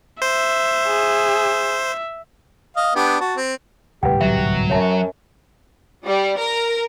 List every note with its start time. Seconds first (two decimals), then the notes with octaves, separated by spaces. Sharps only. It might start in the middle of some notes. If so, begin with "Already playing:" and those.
0.22 C5 E5
0.87 G#4
2.77 D#5 F5
2.95 B3 D4 G4
3.21 F#4 A5
3.37 C4
4.03 D1 C2 G#2 G4 B4 F#5 G5
4.21 F#3 D#5 E5
4.70 F#2 C#5 E5 A5
6.04 G3
6.37 A#4